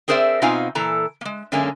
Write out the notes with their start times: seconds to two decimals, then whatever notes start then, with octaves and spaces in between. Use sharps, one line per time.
0.08 C4 G#4 A#4 C5 D5 E5
0.42 B2 C4 D#4 F4 F5 G#5
0.75 A#2 E3 A4 A#5
1.21 G#3 A#3
1.52 F#2 D3 G#3 A#3 C#4 G#5